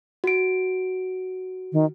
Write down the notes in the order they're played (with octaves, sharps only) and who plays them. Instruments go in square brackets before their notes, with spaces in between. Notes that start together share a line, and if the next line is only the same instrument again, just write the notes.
[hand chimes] F#4 D7
[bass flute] D#3